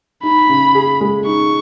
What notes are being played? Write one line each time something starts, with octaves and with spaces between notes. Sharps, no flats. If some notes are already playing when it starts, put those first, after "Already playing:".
D#4 B5
C#3
G#4
G#3
D#4 C#6